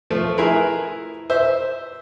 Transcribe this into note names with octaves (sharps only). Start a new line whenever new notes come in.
F3 A3
E4 G#4 A#4 B4
C5 E5